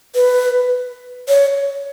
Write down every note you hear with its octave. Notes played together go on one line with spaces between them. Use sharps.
B4
C#5